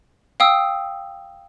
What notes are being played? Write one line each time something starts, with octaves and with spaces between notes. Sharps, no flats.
F5 G5 D#6 E6